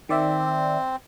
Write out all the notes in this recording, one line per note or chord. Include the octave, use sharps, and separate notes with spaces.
D#3 C4 D5 E5